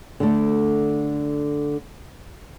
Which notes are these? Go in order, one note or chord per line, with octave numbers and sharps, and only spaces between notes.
D3 A3